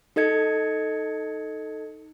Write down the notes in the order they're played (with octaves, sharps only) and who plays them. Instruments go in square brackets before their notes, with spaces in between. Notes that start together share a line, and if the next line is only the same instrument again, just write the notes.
[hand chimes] D#4 A4 D#5 G#6 C#7